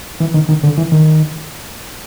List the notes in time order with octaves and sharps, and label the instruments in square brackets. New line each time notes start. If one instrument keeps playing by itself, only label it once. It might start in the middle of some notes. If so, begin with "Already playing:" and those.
[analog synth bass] E3
D#3
D#3
D3
E3
D#3